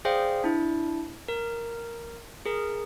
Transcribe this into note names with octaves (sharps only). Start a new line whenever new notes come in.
G#4 C5 D5 F5 G5
D4 E4
A#4
G#4 A#4